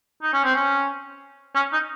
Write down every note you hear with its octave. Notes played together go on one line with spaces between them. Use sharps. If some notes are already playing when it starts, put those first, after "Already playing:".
D#4
C#4
C4
C#4
C#4
D#4